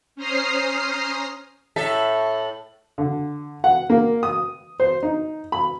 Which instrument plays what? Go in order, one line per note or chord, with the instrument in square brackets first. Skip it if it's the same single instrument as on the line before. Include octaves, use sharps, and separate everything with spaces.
[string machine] C#4 C5 A#5 D#6 F6 C7
[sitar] A2 A4 E5
[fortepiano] D3
F#5
A#3
D#6
C5
D#4
B5